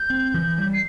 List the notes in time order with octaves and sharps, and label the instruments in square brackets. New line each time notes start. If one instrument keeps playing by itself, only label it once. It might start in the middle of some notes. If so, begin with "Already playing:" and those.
Already playing: [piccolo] G6
[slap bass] C4
E3
G3
[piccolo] C7